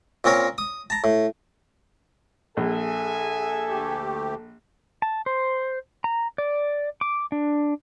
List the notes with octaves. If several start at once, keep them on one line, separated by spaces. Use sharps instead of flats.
A#2 C4 C#4 A#4 C#5
D#6
A5 A#5
A2
A#1 G#4 A4 E5 G#5
D2 A3 G4
A5
C5
A#5
D5
D6
D4